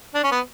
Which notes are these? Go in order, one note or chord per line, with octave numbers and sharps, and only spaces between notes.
D4
C#4
B3